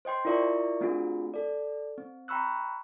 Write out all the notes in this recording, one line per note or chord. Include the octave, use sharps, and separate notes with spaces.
C5 D#5 G5 C6
E4 F4 A#4 D5 E5 C#6
A3 C4 D4 F4 F#4 G#4
A4 D5
C4
G5 A#5 B5 C#6 E6 F#6